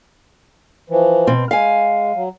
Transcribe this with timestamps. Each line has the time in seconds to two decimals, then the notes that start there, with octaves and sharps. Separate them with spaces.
0.90 E3 F3
1.27 B2 C4
1.51 G#3 F5 G#5
2.15 F#3